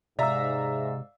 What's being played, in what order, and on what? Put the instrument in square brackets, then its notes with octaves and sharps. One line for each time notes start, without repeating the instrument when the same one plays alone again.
[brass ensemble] G#2 [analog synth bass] C3 [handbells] D5 F5 E6 [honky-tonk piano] E5 A#5